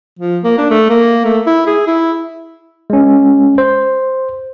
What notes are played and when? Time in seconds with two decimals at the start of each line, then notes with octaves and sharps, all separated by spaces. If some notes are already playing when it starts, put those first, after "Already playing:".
0.19 F3
0.44 A#3
0.58 D4
0.71 A3
0.90 A#3
1.25 A3
1.47 E4
1.67 G#4
1.87 E4
2.90 G#3 C#4
3.58 C5